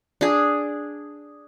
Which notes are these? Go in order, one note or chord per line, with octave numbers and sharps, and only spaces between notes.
D4 G#4